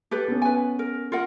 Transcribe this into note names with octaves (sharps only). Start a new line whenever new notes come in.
G4 A4 B4
B3 C#4
B4 G#5
A#4
F4 A#4 F#5